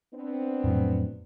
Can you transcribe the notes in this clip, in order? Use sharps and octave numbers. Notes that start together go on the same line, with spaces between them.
B3 C4 D4
F2 A2 F#3